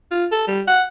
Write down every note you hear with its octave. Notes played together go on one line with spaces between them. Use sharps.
F4
A4
G3
F#5